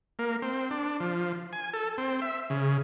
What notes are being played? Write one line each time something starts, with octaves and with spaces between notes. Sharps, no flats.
A#3
C4
D4
F3
G#5
A4
C4
E5
C#3